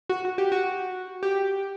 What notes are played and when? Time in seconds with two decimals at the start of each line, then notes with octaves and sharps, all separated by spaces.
0.09 F#4
0.25 F#4
0.38 G4
0.52 F#4
1.23 G4